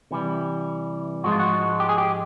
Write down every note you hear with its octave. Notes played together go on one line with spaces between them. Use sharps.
C3 E3 G3
G#2 F3 G#3 F#4
F4
F#4
G4
G#4
G4